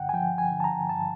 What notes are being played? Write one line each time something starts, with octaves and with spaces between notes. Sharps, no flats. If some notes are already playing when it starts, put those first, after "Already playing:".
Already playing: G2 D3 F#5 G5
G#5
F3 G5
G#5
D3
A5
A#5
G2 A5